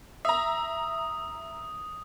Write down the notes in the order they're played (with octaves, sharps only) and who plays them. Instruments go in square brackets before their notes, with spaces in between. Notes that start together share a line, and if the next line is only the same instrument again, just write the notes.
[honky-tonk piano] E5 A#5 [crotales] D#6